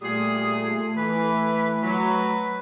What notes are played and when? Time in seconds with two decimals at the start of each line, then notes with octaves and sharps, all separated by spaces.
0.02 A#2 G3 A3 G#4
0.97 E3 B4
1.83 F#3 B4